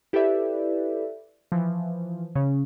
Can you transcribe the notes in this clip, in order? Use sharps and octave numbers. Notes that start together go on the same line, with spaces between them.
E4 G4 A4 B4 D5 E5
E3 F3
C#3 C#4